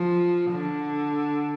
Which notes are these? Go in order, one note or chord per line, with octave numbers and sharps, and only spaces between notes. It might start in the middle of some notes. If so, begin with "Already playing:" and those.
Already playing: F3
D3